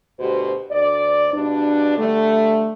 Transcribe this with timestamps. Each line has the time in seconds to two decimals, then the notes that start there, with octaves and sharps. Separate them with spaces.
0.19 D2 B2 F#4 G4 C5
0.71 D2 D5
1.33 G2 B2 D4
1.97 D3 G3 A3